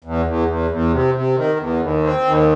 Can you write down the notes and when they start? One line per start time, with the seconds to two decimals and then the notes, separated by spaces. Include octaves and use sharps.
0.05 E2
0.26 E2
0.49 E2
0.71 E2
0.93 C3
1.14 C3
1.37 D#3
1.60 E2
1.81 D#2
2.04 C4
2.25 D#2